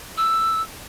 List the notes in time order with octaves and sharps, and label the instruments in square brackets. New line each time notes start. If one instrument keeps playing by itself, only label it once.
[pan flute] E6